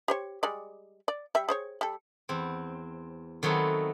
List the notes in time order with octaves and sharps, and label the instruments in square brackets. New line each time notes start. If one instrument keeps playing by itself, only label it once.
[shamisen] G4 C5 C#5
G3 G#3 D5
D5
G3 E5
G#4 C5 C#5
G3 A4
[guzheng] E2 C4
D#3 F#3 A3 B3 C4